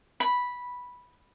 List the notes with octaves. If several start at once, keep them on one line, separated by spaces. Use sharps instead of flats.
B5